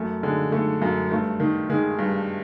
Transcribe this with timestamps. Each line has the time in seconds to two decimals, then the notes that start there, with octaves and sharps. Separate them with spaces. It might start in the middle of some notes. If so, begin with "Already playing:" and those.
Already playing: F#2 A3
0.23 D3 G#3
0.52 D3 A3
0.82 F#2
1.11 G2 A3
1.40 D#3
1.70 D#3 G#3
1.99 G2